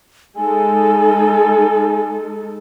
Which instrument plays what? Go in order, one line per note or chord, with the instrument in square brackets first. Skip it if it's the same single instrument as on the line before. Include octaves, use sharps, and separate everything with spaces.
[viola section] G#3 D#4 A4 [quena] G#5